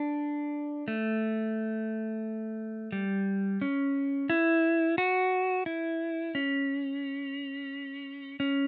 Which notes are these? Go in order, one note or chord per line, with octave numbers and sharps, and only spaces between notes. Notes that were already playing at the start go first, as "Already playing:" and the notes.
Already playing: D4
A3
G3
C#4
E4
F#4
E4
C#4
C#4